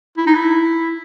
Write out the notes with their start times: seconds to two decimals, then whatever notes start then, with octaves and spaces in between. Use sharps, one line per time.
0.18 E4
0.27 D#4
0.35 E4